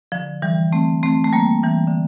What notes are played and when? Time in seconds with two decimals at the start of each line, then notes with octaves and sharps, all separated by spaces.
0.12 D3 F3
0.42 E3 G3
0.73 A3 C4
1.03 A3 C4
1.24 A3
1.33 G3 A#3
1.63 E3 G3
1.87 D3